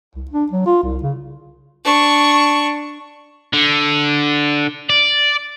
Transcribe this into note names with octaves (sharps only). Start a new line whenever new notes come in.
C2
D4
F#3
F4
C2
C#3
D4 C#6
D3
D5